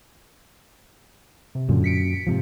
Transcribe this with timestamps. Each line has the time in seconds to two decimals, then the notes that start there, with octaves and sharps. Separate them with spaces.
1.55 C3
1.69 F#2 A#2 D3
1.84 B6 C#7 D7
2.27 G#2 C3 F3